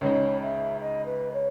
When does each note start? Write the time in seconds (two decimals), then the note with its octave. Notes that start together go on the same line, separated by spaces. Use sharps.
0.01 C#2 C#3 G#3 D#4 C#5
0.41 E5
0.81 D#5
1.06 B4
1.33 C#5